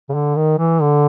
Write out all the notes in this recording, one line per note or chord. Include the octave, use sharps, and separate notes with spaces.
C#3
D3
D#3
E3
D3